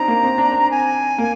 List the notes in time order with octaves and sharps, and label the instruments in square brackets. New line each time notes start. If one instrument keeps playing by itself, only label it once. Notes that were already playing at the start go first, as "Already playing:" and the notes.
Already playing: [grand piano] C4 D4 D#4 [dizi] A#5
[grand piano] A#3
C4
D4
C4
[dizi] G#5
[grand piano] A#3